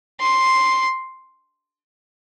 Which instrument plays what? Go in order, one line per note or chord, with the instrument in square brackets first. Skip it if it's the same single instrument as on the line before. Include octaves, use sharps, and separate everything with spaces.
[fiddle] C6